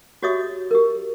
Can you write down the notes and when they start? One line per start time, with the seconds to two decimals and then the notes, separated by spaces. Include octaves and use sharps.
0.22 F#4 G4 C#5 D#5 E5 D#6
0.71 G4 A#4